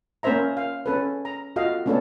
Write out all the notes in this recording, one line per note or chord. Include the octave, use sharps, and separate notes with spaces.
A#3 C#4 A#4 C5 E5 A#5
F5
C#4 A4 B4
A#5
F4 F#4 A4 D#5 F5
A3 B3 C#4 D4 A4